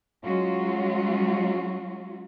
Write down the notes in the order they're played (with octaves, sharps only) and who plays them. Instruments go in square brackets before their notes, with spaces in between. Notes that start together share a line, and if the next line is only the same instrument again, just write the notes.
[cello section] F#3 G#3 C#4 F4 F#4